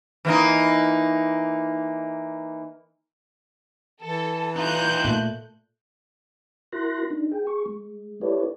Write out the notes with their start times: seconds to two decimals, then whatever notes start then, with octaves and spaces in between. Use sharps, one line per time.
0.25 E3 A#3 D#4
4.02 E3 A4
4.56 D#4 F4 F#6 G6
5.05 A#2 A3
6.72 E4 F#4 A#4 C6 F#6 A#6
7.10 D4 D#4
7.32 G#4 G5
7.47 G#4 C#6
7.66 G#3
8.21 E4 G4 A4 B4 C#5 D5